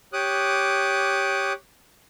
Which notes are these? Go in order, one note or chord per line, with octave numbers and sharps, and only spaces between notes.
G4 C#5 D6 D#6 F#6